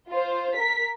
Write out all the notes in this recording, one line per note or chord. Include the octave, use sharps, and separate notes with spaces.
F4 C5
A#4 B6